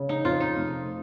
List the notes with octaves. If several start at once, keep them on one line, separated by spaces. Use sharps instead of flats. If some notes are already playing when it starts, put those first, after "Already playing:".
Already playing: C#3
D#4
F2 F4
D#4
F1